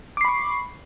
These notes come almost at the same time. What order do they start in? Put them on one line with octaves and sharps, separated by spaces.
D6 C7 B5 C#6